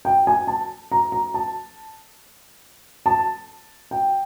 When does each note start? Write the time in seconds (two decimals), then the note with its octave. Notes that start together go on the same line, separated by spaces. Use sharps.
0.05 G5
0.27 G#5
0.47 A5
0.92 A#5
1.12 A#5
1.34 A5
3.06 A5
3.91 G5